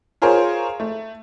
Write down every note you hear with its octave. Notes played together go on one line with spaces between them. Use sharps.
F4 G#4 A#4 C5 C#5
A3